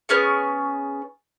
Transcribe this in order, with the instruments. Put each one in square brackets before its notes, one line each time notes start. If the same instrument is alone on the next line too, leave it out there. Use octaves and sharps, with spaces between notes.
[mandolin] B3 C#4 G#4 C#6